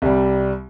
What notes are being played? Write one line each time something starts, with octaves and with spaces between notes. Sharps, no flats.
C2 C3 G3